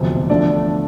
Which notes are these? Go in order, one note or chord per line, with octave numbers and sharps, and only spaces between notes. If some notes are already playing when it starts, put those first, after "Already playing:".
Already playing: E1 D2 C3 F3 C4
D3 F3 A3 D4 D5